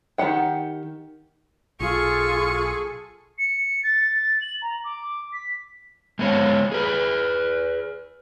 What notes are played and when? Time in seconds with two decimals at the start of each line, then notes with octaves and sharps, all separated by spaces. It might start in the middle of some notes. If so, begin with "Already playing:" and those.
0.18 D#3 E3 G4 F#5 G5
1.81 B1 F4 G#4 A4 C#6
3.38 C#7
3.83 A6
4.41 F#7
4.62 A#5
4.84 D6
5.33 B6
6.19 G#3 A3 B3 C#5 D#5 F5
6.72 G#4 B4